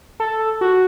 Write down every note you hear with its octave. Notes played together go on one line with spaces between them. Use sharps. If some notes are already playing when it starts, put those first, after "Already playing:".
A4
F#4